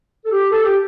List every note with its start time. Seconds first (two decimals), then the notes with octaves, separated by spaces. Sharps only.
0.25 A4
0.31 G4
0.50 A4
0.63 G4